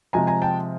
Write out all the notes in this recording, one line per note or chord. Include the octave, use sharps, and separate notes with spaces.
C3 F3 G#3 G#5 A#5
G#5 A#5
G5 A5